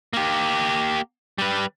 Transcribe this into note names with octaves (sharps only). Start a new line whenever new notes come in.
A#3 G4
G3 B4